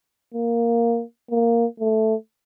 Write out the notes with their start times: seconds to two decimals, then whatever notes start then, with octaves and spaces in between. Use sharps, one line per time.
0.34 A#3
1.31 A#3
1.80 A3